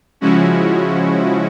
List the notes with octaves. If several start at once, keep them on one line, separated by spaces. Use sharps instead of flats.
C#3 F3 G#3 C#4 E4 F#4